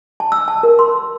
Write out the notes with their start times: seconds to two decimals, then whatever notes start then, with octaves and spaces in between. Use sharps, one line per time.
0.20 A5
0.32 E6
0.48 A5
0.63 A#4
0.79 C6